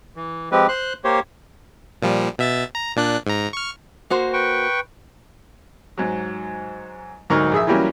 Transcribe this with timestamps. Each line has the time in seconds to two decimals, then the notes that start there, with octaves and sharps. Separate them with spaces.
0.16 E3
0.52 F3 G#3 C4 G4 B4
0.69 C5 C6 F#6
1.04 A#3 G4 C5 C#5
2.02 A#2 F3 G3
2.38 B2 E5 A6
2.75 A#5
2.96 A#2 D4 F#6
3.27 G#2 A#5
3.53 C#6 F6
4.10 A#3 F#4 C5
4.33 B4 G5 C#6
5.97 G#2 F#3
7.30 D2 G#2 F#3 D#4 A#4 C#6
7.52 A#1 G#4 E5
7.67 E3 F#3 G3 A#3 C#4